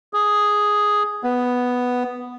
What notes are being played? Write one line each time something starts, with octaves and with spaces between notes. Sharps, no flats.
G#4
B3